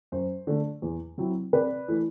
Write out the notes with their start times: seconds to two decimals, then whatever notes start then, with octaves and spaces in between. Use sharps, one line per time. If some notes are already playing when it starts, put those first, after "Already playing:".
0.12 F#2 C5
0.47 D3 A3 D4
0.82 E2
1.18 C3 F#3 C4 E4
1.53 C3 B4 D5
1.88 E3 A3